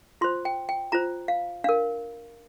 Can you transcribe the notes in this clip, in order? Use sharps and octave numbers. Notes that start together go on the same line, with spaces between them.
F4 C5 C6
G5
G5
F4 C5 A#5
F5
D4 A#4 F5